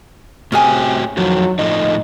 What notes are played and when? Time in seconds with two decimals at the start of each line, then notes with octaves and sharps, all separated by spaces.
0.52 A2 C3 C#4 F#4 G#4 G5 G#5
1.17 F2 D#3 F3 F#3
1.59 A2 F3 D#4 D#5